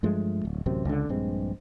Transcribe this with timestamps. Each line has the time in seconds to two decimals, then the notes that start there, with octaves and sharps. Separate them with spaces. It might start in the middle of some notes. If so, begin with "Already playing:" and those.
0.03 G2 F3 G#3 A3
0.45 D1
0.66 A1 F#2 C3 C4
0.85 C#2 D3
1.09 A#1 G2 G#3 C4